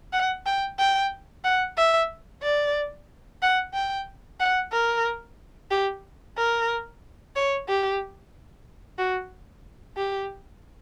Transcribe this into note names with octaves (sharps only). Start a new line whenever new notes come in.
F#5
G5
G5
F#5
E5
D5
F#5
G5
F#5
A#4
G4
A#4
C#5
G4
F#4
G4